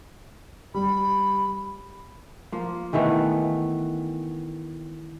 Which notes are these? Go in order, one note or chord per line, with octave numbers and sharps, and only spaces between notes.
G3 B5
F3 A#3
D#3 E3 A3 B3